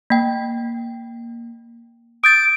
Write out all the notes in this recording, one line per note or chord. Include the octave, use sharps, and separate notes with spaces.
A#3 G5
D#6 G6 A6 D7